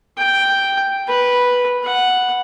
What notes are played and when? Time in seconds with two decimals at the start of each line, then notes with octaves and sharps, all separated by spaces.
0.18 G5
1.08 B4
1.84 F#5